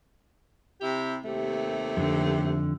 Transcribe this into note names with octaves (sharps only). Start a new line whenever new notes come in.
C3 E4 G4
D#2 C3 A3
F2 D3